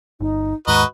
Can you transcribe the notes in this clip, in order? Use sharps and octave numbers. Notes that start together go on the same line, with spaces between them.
G1 D#4
D#2 G#2 F#4 B4 D#5 A#5